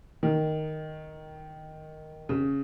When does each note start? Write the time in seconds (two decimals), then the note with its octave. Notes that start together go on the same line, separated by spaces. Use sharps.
0.23 D#3
2.29 C#3